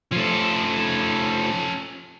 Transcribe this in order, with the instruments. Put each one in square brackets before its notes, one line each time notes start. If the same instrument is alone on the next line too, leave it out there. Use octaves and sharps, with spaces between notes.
[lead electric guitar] F3 A3 [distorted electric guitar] C#4 A4